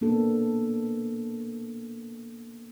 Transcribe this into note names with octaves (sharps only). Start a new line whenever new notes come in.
A#3 B3 D4 A4